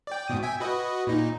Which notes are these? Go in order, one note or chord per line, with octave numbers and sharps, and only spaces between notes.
D5 G5
G#2 B2 D#6
E5 G5 G#5
F#4 B4 D#5
A#2 D#4